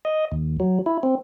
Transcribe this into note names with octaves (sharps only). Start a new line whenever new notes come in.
D#5
D#2
F#3
E4
C4